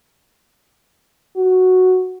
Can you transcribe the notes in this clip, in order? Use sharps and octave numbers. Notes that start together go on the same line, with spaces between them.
F#4